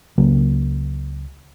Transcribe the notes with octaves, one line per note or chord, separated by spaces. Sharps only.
C#2 C#3 F#3 A#3